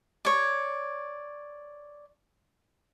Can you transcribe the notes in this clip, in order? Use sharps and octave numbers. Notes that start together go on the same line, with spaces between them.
C#5 D5